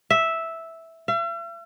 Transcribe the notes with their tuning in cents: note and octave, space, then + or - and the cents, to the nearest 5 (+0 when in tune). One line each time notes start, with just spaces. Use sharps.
E5 -5
E5 +45